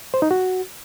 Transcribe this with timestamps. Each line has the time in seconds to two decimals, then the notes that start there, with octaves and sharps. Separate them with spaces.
0.14 C5
0.22 D#4
0.31 F#4